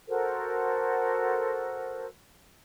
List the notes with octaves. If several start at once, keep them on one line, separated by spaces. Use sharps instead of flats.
F#4 A4 A#4 C5